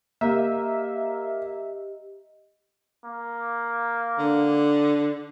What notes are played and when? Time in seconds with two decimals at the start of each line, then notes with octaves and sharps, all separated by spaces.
0.21 A#3 G4 D#5 E5
3.05 A#3
4.19 D3